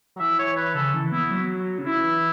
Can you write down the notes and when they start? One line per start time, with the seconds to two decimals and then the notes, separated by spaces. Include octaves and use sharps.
0.16 F#3
0.19 E3 E5
0.39 C#5
0.57 B4
0.75 C#3 A4
0.94 E3
1.12 B3 E4
1.31 F#3
1.59 F#3
1.78 C#3
1.86 E3 E4